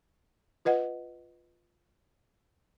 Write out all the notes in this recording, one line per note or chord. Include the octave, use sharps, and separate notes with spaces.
F4 B4 D#5 F#5